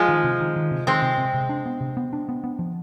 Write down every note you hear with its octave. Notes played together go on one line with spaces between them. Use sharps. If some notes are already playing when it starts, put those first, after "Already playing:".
Already playing: F3 G#3
D#3
C3
D#3
D#3
C3
D#3 G#3 C4
C3
C3
C3
D4
B3
C3
B3
D4
B3
B3
F3